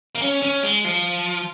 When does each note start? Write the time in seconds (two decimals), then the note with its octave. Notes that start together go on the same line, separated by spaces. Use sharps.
0.15 A#3
0.22 C#4
0.42 C#4
0.63 G#3
0.84 F3